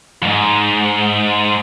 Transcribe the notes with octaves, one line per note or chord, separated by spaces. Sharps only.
F2 G#2